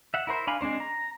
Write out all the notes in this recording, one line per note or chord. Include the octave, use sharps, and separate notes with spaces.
E5 F#5
E4 A#4 C5
D4 F5 G#5 B5
G#3 C4 D4 C5
A#5